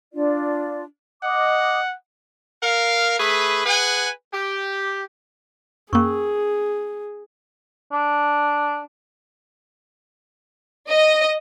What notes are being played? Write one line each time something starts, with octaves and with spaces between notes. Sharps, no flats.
D4 F4 D5
D#5 F#5 D6 D#6
A#4 F5
A3 G#4 B4 B5
G#4 B4 F#5 G#5
G4
F#2 A#3 C#4 G#4 A#4 C#6
D4
D#5